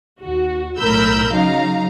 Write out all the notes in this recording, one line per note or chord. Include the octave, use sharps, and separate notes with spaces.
D#2 F#4
B1 A2 A#4 B5 E6 G6
C#3 F#3 D#4 F5 A#5